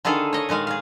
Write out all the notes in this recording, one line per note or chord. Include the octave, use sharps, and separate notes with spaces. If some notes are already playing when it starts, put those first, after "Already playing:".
D3 D#3 G#4 A4 F5
C#5 D#5
A#2 D#3 G#3 F5
G#4 F5